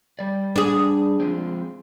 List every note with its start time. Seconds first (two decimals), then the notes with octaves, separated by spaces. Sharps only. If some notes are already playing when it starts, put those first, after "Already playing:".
0.19 G3 D5
0.56 D4 G#4
1.20 F3 G#3 C4